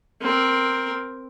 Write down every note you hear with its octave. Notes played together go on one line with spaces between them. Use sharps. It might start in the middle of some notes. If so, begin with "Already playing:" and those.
C4 A#4